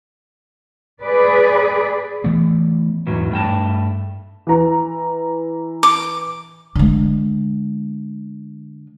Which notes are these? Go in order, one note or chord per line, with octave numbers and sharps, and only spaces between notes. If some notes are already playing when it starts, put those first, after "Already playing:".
G#4 B4 D5
E3 A3 B3
E2 G#2 F#3 B3
G2 A3 G5 A5
E3 A#5
D6
D3 G#3